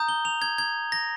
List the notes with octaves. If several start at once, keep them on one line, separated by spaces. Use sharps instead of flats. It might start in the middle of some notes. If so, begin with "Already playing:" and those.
Already playing: A#5 D#6 G6
G7
F7
G#6
G#6
A#6